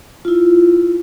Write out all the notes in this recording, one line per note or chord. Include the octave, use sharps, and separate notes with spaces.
E4 F4